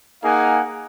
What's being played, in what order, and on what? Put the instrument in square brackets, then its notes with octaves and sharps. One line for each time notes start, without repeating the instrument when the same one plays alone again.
[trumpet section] A#3 D#4 G#4 F5 F#5 G#5